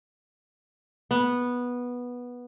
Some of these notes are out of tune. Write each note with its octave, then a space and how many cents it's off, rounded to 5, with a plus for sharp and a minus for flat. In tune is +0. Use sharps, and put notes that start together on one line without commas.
B3 -10